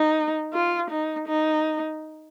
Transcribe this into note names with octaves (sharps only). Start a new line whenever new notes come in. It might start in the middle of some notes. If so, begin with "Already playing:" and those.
Already playing: D#4
F4
D#4
D#4